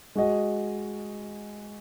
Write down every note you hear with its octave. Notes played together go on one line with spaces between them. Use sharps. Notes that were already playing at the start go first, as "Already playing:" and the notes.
G#3 F#4 D#5